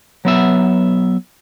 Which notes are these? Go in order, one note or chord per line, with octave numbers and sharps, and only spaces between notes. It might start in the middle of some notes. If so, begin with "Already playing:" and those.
F#3 B3 E5